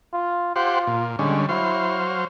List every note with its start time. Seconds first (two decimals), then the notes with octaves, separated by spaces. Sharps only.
0.13 F4
0.56 F4 G4 C5 F#5
0.87 A#2
1.19 D3 G3 G#3 C#4
1.49 F#3 E4 C5 F5